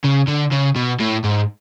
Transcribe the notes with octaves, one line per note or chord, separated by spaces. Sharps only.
C#3
D3
C#3
B2
A2
G#2